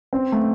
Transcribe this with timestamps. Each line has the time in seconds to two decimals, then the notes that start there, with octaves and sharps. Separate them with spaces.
0.13 C4
0.32 A3